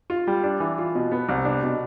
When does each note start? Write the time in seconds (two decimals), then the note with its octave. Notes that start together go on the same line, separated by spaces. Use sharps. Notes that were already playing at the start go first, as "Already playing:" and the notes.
0.10 F4
0.27 G3
0.43 D4
0.60 E3
0.78 F4
0.95 B2
1.12 B3
1.29 C2
1.45 D4
1.63 B2